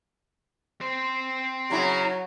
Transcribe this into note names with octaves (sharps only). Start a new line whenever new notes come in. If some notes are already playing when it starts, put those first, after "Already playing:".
C4 C5
C#3 F#3 E4 A#5